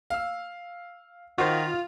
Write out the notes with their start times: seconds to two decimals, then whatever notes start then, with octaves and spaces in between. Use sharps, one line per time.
0.10 F5 E6
1.38 D#3 F4 F#4 C5